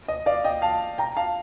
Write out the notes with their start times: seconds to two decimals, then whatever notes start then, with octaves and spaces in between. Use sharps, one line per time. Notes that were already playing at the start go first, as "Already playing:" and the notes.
0.08 D#5
0.26 D5 F5
0.44 D#5 G5
0.62 F5 A5
0.98 G5 A#5
1.17 F5 A5